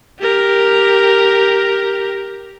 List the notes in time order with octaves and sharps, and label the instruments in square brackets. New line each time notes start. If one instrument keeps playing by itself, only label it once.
[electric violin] G4 A#4